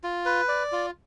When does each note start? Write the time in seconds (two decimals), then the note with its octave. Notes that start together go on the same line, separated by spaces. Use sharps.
0.04 F4
0.25 B4
0.48 D5
0.72 F4